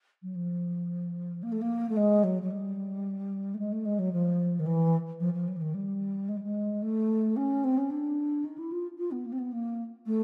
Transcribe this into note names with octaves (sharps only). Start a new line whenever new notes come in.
F#3
F3
A#3
A3
A#3
A3
G#3
F#3
F#3
G3
A3
G#3
A3
G#3
F#3
F3
D#3
E3
F3
F3
F#3
E3
D#3
G3
G#3
G3
G#3
A3
C#4
C4
C#4
D4
D#4
E4
F4
F4
B3
A#3
C4
B3
A#3
A3